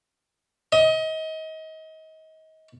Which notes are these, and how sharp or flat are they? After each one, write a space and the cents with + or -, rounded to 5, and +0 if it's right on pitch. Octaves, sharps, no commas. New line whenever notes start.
D#5 +30